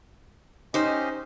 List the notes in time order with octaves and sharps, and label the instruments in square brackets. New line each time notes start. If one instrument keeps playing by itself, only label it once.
[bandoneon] C#4 G4 D#5 [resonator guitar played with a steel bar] D#4 C5